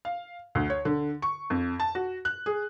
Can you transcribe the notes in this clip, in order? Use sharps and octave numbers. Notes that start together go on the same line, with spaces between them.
F5
D2
C#5
D3
C#6
F2
A5
F#4
F#6
G#4